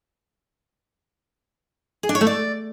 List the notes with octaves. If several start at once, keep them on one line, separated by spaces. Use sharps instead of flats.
G#4
D4
C#5
A3
D5